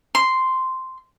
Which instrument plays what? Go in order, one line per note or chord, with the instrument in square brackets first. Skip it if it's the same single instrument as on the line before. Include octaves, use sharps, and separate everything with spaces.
[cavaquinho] C6